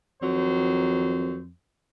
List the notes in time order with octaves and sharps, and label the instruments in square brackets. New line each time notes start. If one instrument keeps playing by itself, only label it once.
[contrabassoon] F2 [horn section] D#3 F#3 C5